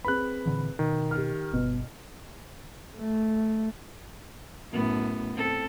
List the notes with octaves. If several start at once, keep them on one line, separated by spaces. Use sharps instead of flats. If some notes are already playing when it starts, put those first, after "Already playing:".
C4 G#4 B4 B5 F#6
A#2 D3 E3
B2 D#3
G4 F6
G1 B2
A3
F#2 A2 B3
C4 A4